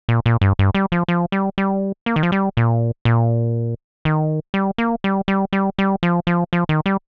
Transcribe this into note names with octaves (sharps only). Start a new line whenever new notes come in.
A#2
A#2
G2
G2
G3
F3
F3
G3
G3
A#3
D#3
F3
G3
A#2
A#2
D#3
G3
A#3
G3
G3
G3
G3
F3
F3
F3
D#3
G3